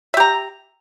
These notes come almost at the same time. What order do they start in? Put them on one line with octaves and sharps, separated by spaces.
E5 G4 A#5